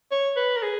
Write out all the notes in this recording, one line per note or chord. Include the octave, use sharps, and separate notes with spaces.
C#5
B4
A#4
G#4